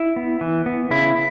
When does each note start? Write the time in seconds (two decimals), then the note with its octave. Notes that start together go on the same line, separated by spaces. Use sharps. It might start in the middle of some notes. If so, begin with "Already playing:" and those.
Already playing: E4
0.16 B3
0.41 E3
0.66 B3
0.91 C#3 E4